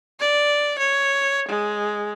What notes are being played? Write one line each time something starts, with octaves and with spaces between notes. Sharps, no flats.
D5
C#5
G#3